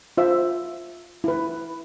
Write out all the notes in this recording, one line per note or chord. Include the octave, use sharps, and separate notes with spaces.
F4 C5 E5
E4 B4